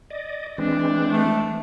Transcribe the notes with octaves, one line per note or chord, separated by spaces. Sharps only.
D5 D#5
E3 G#3 C4 D4
A3